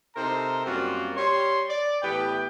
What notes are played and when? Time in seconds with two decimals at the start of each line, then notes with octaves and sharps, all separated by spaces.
0.15 C3 D#4 A4 A#4 C5 A#5
0.65 F#2 G3 A#3 C4 F4 F#4
1.16 G3 C#5 C6
1.69 D5
2.02 A2 E3 B3 G4 B4 G5